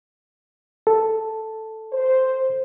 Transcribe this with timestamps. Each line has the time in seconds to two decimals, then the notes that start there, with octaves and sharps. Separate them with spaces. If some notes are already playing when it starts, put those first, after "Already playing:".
0.87 A4
1.93 C5